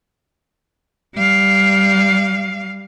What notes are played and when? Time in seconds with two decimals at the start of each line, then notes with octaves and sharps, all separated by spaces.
1.15 G3 F5